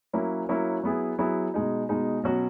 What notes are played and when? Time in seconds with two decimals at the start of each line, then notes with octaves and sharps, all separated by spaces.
0.13 F#3 A#3 C#4 E4
0.49 F#3 A#3 C#4 E4
0.84 F#3 B3 E4 G#4
1.18 F#3 B3 E4 G#4
1.54 B2 G#3 D#4
1.89 B2 G#3 D#4
2.24 B2 F#3 C#4 F#4